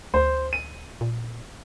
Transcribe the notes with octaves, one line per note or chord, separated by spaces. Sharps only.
D2 C5
D#7
A#2